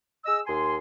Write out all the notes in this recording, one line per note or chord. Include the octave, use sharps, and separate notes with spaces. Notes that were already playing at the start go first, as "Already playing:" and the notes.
G#4 D#5 E6
D#2 G#5 C6